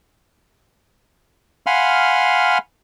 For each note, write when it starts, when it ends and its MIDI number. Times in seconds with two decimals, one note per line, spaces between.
1.67 2.58 77
1.67 2.58 78
1.67 2.58 80
1.67 2.58 83
1.67 2.58 84
1.67 2.58 89